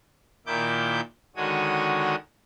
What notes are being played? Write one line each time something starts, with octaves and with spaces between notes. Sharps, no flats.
A#2 D#3 E4 D6 G6
D3 D#3 G#3 F#4 C#5 D#6